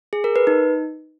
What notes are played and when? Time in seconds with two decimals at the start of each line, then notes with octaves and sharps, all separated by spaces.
0.13 G#4
0.24 A#4
0.36 B4
0.47 D#4